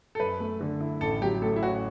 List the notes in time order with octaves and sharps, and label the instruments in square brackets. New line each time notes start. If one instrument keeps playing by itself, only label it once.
[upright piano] A4
[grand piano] F#2 [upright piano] B4
[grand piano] A3
D3
E4
[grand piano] A1 [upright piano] A4
[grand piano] F#3 [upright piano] G4
[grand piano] A2 [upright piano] A4
[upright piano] E4
[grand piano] C#4 [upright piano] F#4